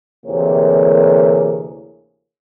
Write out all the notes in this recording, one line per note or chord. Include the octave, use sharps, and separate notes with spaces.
D2 C3 E3 A#3 G#4 C#5